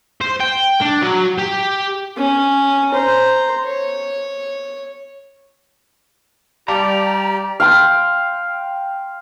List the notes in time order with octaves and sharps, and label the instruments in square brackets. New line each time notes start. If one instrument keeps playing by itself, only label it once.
[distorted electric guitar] C5
G5
D4
F#3
G4
[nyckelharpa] C#4
C5 A#5
C#5
[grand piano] G3 [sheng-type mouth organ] G4 D5 [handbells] F5 A5 D6 [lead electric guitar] A#5
[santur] F5 G5 C6